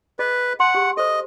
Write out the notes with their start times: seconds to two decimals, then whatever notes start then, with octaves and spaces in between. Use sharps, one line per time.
0.19 G#4 B4 D#5
0.60 F#5 A5 C6
0.74 G4 G#4
0.97 A4 C5 D#5